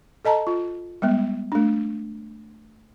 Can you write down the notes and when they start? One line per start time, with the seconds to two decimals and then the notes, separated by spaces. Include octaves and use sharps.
0.25 A4 D#5 A5 A#5
0.47 F4
1.02 G3 G#3 B3
1.52 A3 D4